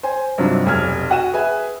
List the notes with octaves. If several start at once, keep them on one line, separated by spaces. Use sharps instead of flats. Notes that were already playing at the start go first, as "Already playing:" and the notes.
C5 G#5
G2 C3 F3 F#3 D4 D#4
F1 B1 F6 G#6
F#4 F#5 D#7 E7
G#4 B4 E5 G#5